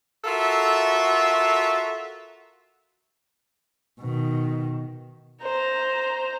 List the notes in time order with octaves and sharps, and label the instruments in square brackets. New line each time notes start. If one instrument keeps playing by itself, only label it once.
[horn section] F4 F#4 A4 A#4 E5
[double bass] B2 D#3
[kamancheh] C5 A#5